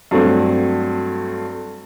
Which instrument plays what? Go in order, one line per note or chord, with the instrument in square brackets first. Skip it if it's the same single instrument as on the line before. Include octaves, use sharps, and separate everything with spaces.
[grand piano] G2 F#3 A3 C4